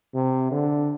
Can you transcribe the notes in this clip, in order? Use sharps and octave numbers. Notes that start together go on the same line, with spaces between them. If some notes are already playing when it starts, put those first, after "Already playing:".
C3
D3